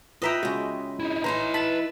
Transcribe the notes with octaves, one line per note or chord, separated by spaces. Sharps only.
F4 B4 D#5 E5 G5 A#5
C#3 G#3 F#4
D#4 E4
E3 D#4 E4 B4 A#5 C6
A5 B5